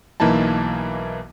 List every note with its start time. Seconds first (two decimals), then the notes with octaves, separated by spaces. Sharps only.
0.20 B1 E3 A#3 D#4 E4 A5